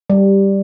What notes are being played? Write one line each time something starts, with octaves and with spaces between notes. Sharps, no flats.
G3